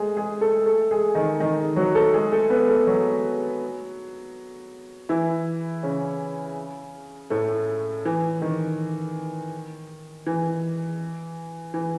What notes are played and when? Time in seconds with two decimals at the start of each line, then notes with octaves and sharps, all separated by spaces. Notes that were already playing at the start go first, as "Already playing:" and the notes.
Already playing: G#3 A3 G#4
0.17 G#3 G#4
0.41 A3 A4
0.66 A3 A4
0.91 G#3 G#4
1.15 D#3 D#4
1.40 D#3 D#4
1.76 F#3 F#4
1.95 A3 A4
2.14 G#3 G#4
2.32 A3 A4
2.50 B3 B4
2.69 A3 A4
2.87 F#3 F#4
5.09 E3 E4
5.83 C#3 C#4
7.30 A2 A3
8.05 E3
8.42 D#3
10.26 E3
11.74 E3